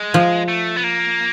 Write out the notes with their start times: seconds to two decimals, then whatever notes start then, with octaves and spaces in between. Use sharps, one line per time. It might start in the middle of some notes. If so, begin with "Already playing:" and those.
Already playing: G#3
0.14 F3
0.48 A3
0.76 B3
0.84 A#3